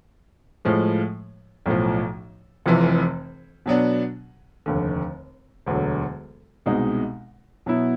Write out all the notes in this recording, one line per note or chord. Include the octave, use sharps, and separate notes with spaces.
A2 F3 G#3
B1 A2 F3
F1 F2 C3 E3
B2 F#3 B3 D4
F1 D#2 D3
E1 D2 D3 F#3
C2 B2 G#3 C4 D#4
B2 F#3 B3 E4